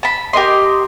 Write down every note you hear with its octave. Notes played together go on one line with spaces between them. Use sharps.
A5 B5
G4 A#4 D#5 C6